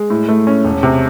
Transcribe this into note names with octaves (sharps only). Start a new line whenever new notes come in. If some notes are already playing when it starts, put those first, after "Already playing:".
Already playing: G#3
A2
A3
C#4
E1
C3